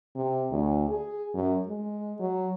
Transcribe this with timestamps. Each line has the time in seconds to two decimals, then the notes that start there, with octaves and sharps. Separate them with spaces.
0.15 C3
0.51 D2
0.89 G#4
1.34 F#2
1.68 G#3
2.20 F#3